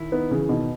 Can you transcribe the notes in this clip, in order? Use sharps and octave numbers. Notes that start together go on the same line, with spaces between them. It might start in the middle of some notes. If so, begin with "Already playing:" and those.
Already playing: D#3 C#4 E4
B3 D#4
C#3 E3
B2 D#3